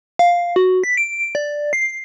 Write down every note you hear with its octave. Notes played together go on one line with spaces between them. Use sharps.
F5
F#4
B6
D7
D5
C7